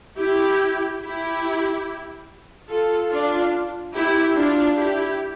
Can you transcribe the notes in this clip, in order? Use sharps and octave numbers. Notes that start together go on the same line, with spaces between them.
E4 G4
E4 G4
F4 A4
D4 F4
E4 G4
D4 F4
E4 G4